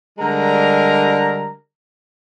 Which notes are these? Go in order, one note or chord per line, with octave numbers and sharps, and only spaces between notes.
D3 G3 G#3 A#4 A#5